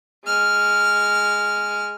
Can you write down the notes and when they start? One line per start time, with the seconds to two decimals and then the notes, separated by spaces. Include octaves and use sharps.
0.25 G#3 F6